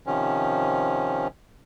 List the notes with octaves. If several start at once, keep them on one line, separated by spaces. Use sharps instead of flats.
C3 D#3 F3 C#4